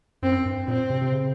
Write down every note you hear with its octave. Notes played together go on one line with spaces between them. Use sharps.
F#2 C4
G2
A#2 C4
C3
C3
C#3